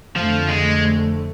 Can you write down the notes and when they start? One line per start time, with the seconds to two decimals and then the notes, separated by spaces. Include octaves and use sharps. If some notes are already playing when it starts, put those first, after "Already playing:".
0.16 F2 D3 F3 A3
0.49 G#3